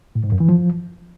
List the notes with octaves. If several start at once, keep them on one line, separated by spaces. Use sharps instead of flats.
A2
G#2
F#2
E3
F3